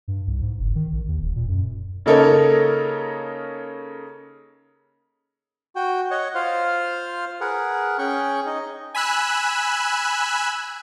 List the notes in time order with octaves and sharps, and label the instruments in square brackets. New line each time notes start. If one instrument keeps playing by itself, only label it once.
[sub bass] G2
C2
G#2
F#1
D#3
A#1
D#2
D#1
A#2
F#2
[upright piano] C#3 A#3 D#4 A4 A#4 C#5
[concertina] F#4 G5
C#5 D#5 F#5
F4 C5 F5
G#4 A#4 B4 F#5
C#4 G#4 G5 C#6
D#4 D#5
[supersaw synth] G#5 B5 E6 F#6